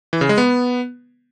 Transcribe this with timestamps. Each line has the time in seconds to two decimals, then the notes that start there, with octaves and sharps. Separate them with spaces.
0.13 E3
0.21 C#3
0.29 G#3
0.38 B3